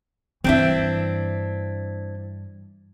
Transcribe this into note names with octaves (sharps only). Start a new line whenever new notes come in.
G2 E3 C4 D4 E4